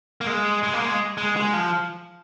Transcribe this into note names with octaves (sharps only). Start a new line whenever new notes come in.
A#3
G#3
G#3
A#3
G#3
G#3
G#3
F3